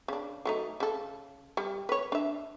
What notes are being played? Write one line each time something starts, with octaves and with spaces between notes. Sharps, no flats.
C#3 D4
F#3 A3 D#4
C#3 A4
G3
B4 C#5
D4 E5